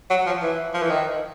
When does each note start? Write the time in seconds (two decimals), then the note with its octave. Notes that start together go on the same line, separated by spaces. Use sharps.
0.10 F#3
0.26 F3
0.42 E3
0.74 F3
0.82 E3
0.90 D#3